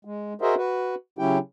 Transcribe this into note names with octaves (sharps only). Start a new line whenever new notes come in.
G#3
F#4 G#4 A#4 C5 D#5 E5
F#4 B4
C#3 F#3 C#4 E4 G4 G5